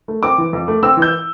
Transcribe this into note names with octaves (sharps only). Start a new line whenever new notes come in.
A3
C4 D6
E3
F2
A3
C4 E6
E3
G6